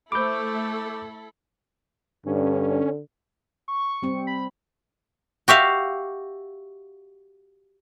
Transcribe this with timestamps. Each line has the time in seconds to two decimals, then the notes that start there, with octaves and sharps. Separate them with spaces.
0.12 A3 E4 A4 C5 B5 D6 G6
2.26 G2 D3 C#4
3.68 C#6
4.03 G3 C4
4.27 B5
5.48 F#4 G4 E5 F5